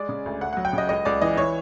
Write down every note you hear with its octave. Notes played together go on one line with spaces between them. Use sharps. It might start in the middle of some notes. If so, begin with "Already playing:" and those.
Already playing: G#3 D5
C#3
D2
D2 F#5
F#3 F#5
G5
C#3
D#5
C#2 D#5
C#2 D5
E3 D#5
E3 C#5